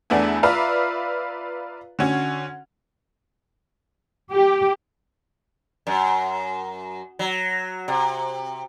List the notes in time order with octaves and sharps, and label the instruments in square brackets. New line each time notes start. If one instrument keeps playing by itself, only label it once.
[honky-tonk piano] E2 A3 B3 D4 E5 G#5
F4 B4 D5 E5 F5 A#5
D3 C#4 F#4
[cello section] G4
[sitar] F#2
F#3
C3